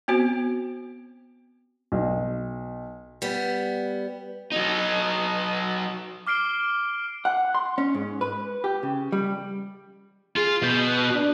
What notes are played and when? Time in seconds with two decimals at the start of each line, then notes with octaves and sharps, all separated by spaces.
0.08 B3 C4 F#4 C5
1.92 B1
3.22 G3 B3
4.52 F#3 D#4
6.27 D6 F6 C7 D7 G7
7.25 F#5
7.55 C6
7.78 C#4
7.95 G#2
8.21 B4
8.64 G4
8.83 C#3
9.12 G3
10.36 F4 G#4
10.63 B2 G6
10.88 F#6
11.15 D4